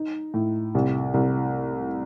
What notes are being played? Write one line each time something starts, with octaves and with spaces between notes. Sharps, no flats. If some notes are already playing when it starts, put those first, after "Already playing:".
Already playing: D#4
A2
C2
C2